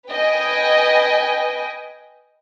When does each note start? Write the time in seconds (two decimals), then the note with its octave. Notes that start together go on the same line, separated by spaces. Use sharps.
0.11 B4 D#5 G5 G#5